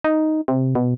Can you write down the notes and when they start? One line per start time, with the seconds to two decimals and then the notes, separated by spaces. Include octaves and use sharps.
0.04 D#4
0.48 C3
0.75 B2